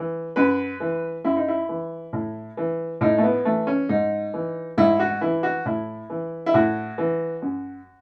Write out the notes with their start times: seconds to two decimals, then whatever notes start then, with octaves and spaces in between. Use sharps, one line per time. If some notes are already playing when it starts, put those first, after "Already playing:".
Already playing: E3
0.36 F#2 B4
0.80 E3
1.24 F#2 E4
1.37 D#4
1.48 E4
1.69 E3
2.13 A2
2.57 E3
3.01 A2 D#4
3.18 A3
3.23 B3
3.45 E3 A3
3.67 C#4
3.89 G#2 D#4
4.34 E3
4.78 G#2 E4
4.99 F#4
5.21 E3 E4
5.43 F#4
5.66 A2 E4
6.10 E3
6.46 E4
6.54 A2 F#4
6.98 E3
7.42 F#2